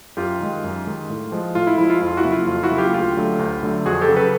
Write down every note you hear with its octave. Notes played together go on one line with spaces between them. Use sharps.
F#2 F4 G4
D#3 G#3
F#2
D#3 G#3
A2
F3 G#3
A2 F4
E4
F3 G#3 E4
F4
F2 F4
E4 F#4
C#3 F#3 A#3
F4
F2 F4
E4 F#4
C#3 F#3 A#3
F4 G4
D2 F4 G4
D3 F#3 A3
D2
D3 F#3 A3
F2 F#4 G#4
G4 A4
C#3 F#3
A4 B4